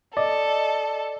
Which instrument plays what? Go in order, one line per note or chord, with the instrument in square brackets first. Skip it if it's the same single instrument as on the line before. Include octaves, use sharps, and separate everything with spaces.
[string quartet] A4 [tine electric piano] D5 [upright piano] D#5